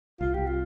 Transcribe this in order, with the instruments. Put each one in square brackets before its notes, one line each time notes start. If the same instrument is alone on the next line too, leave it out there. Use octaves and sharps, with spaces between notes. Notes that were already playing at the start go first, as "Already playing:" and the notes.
[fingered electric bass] C2 [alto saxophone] F4
[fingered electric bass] C2 [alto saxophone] G4
[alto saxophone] F4